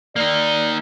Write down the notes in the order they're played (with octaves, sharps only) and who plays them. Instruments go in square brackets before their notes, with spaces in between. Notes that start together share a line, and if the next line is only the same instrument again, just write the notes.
[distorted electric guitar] A#3 D#4 [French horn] D5